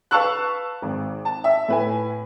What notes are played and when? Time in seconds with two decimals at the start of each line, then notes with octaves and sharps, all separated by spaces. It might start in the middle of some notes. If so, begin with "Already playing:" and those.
0.11 B4 F5 A5 C#6 E6 F#6
0.82 G#1
1.25 A5
1.44 E5
1.68 A2 B4 G#5